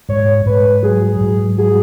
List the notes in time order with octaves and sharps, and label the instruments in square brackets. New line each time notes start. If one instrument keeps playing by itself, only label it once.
[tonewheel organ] G#2 [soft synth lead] C#5
[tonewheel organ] G#2 [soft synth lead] B4
[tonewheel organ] F#3 [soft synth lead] G#4
[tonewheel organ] G#2
[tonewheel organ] F#4 [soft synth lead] G#4